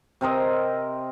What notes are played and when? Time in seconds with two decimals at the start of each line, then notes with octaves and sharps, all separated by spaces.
0.21 C3 C4 A#4 D#5